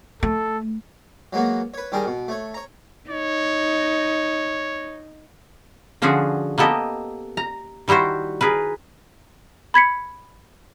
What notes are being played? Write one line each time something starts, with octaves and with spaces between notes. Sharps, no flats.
A3 A4
F#3 G#3 A#3 B3 F#4
B4 C#5
D#3 G3 G#4 A#4
B2
A3 C#5
C#5 A#5
D#4 C#5
D3 F3 C#4 D4 F#4 G#4
A#3 B3 G4 A4 D#5
A#5
D#3 G3 E4 F#4 C5
G#4 A#4 B4
B5 G#6 B6 C#7